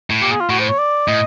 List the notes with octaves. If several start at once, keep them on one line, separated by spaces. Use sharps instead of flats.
A2
A#2 G4
G#4
F4
A2 F#4
C5
C#5
D5
A2 D#5